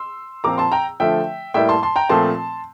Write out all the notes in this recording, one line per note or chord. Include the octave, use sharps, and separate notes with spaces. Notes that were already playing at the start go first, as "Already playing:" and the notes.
Already playing: C6 E6
A#2 F3 C4 A#5 D6
A5 C6
G5 A#5
D3 F3 A3 E5 G5
A2 G3 A#3 E5 G5
A5 C6
A5 C6
G5 A#5
A#2 F3 A3 C4 A5 C6